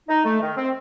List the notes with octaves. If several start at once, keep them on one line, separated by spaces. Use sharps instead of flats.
D#4
A3
D#3
C4